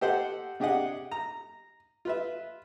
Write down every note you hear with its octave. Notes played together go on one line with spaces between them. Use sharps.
G4 A4 C5 D#5 F#5
C3 D4 G4 G#4 D#5 F#5
A#5
F4 B4 E5